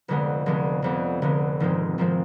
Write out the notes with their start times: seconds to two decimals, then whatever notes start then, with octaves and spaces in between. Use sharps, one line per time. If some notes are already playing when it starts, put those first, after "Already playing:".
0.08 F1 F2 D3 G#3 B3
0.46 F1 F2 D3 G#3 B3
0.82 F1 F2 D3 G#3 B3
1.22 F1 F2 D3 G#3 B3
1.60 G#1 G#2 F3 G#3 C4
1.98 G#1 G#2 F3 G#3 C4